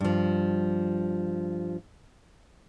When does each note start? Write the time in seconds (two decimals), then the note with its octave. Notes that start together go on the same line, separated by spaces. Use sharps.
0.01 G2 F3